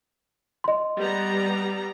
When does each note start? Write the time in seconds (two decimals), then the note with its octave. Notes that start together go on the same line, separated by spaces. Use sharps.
0.64 D#5 C6
0.97 G3 B3 A#5